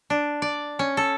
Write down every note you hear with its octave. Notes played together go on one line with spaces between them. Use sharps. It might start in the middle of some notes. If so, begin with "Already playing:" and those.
D4
D5
C#4
A4